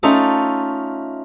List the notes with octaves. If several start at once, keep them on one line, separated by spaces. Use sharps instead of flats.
A3 C#4 D#4 F4 A4